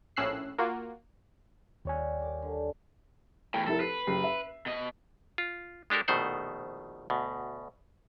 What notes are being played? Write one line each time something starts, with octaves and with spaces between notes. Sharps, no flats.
A#1 A2 C#4 E6 F#6 C7
A#3 F4 F#4
D#2 G3 G4 C#5 F#5 G#5
D#3 D6
D3
E2 A2 G5
F1 E4 A4 A#4
A4 B4 C7
F#1 G4 C7
E5
B2 D#5
F4
G#3 D4 G4 A4 A#4
A#1 B2 D#3 A3 C5 F#5
D2 B2